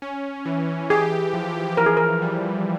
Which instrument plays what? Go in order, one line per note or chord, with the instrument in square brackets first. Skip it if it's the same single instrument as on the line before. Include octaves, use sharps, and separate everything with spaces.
[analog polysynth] C#4
E3
[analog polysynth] G4 [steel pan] G#4
[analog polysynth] F3
[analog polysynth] E3 [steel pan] A#4
[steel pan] G#4
A#4
[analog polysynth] G3